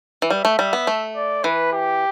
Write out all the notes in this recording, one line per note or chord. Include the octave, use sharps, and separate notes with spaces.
E3
G3 E5
A3
G3
B3
A3
D5
E3 B4
G4